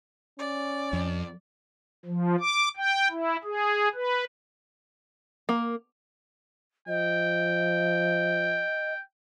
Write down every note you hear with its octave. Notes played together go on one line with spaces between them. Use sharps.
C#4 D5
F2
F3
D6
G5
E4
G#4
B4
A#3
F3 D#5 G5